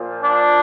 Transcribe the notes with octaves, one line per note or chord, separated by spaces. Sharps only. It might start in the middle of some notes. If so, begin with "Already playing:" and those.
Already playing: A#2 F3
D4